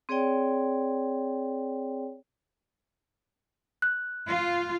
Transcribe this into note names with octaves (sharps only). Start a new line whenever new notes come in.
C4 G#4 C#5 D5 G5
F#6
F4